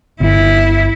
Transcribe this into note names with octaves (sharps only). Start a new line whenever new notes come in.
G1 E4